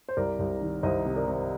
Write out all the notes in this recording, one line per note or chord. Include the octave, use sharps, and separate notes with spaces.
C5
C2 A#4 D5
C2
D#3
C2 C5 D#5
C3
A#4 D5
C3